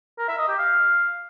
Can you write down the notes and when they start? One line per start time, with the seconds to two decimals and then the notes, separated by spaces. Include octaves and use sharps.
0.18 A#4
0.28 E5
0.38 D#5
0.48 G4
0.58 F5